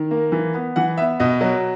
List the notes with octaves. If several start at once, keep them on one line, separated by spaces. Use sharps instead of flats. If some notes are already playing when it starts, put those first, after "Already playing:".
Already playing: D#3
A#3
E3
B3
E3 F#5
B3 E5
B2 D#5
F#3